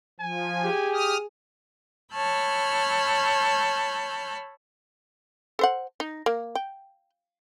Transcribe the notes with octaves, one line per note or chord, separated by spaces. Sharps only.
F3 G#5
G4 G#4
D#6 F6
C#5 A5 B5 E6 F6 G6
A4 C5 F#5
D#4
A#3
G5